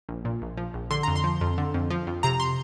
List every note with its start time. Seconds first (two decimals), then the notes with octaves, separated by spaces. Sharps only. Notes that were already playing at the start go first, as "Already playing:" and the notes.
0.09 A#1
0.25 A#2
0.42 A#1
0.57 F3
0.74 A#1
0.90 D3 C6
1.03 F2 A#5
1.16 C6
1.24 F3
1.41 F2
1.58 D3
1.74 F2
1.90 F3
2.07 F2
2.23 C3 A#5
2.40 C6